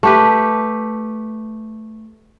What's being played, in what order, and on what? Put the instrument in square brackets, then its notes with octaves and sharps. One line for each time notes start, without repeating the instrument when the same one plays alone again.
[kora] A3 G4 B4